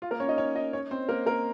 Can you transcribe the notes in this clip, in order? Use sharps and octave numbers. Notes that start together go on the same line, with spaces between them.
F4
A#3 A#4
C#4 C#5
D#4 D#5
C#4 C#5
D#4 D#5
C#4 C#5
C4 C5
A#3 A#4
A#3 A#4